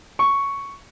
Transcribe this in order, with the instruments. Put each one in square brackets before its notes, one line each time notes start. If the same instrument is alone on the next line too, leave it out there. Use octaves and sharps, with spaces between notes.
[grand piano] C#6